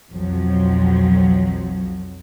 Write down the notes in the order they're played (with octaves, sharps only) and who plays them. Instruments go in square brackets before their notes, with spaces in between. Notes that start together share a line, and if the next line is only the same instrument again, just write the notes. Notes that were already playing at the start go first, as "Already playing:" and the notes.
[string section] B1 F2 F3 F#3